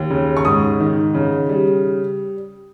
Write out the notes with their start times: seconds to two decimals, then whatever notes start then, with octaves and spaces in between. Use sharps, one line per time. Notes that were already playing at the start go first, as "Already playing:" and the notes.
Already playing: D#2
0.10 C#3
0.37 C#6
0.45 G#2 D#6
0.80 D#3
1.14 C#3
1.49 G3